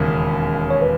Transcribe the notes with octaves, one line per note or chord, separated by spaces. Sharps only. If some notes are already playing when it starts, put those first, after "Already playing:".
Already playing: E1 D#2 C#3 A#4
C#5
B4